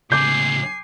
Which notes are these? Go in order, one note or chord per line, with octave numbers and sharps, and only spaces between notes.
C#2 A2 G#5 D6 G6 C7